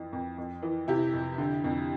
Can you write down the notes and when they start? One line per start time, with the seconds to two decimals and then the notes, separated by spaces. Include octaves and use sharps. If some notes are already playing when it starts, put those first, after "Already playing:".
Already playing: F2 E3
0.13 F2
0.38 F2
0.62 E3
0.88 C3 E4 G4
1.13 F2
1.38 D3
1.64 F2